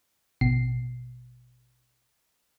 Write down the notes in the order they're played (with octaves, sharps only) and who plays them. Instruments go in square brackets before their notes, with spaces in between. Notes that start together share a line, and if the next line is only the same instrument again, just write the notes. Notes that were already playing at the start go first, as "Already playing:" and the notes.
[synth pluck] A1 B2 C7